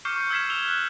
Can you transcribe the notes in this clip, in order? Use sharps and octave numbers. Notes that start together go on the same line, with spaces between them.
C#6 D6 F6 G6 C7 C#7
E6 F6 G#6 B6 C7 E7
E7 F7 G7
F#6